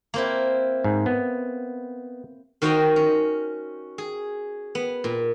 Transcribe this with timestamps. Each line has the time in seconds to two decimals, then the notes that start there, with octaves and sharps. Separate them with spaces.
0.14 A#3 C4 E4
0.84 G#2
1.06 B3
2.62 D#3 F#4 C5 D#5 G5 A#5
2.96 C#4
3.98 G#4
4.75 B3
5.04 A#2